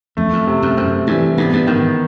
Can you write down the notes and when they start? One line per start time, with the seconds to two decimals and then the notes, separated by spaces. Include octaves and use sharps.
0.17 F2 A3
0.33 F2
0.47 C3
0.62 F2
0.77 F#2 C4
1.07 G2 E3
1.38 G2 B3
1.53 G2
1.67 G#2 D#3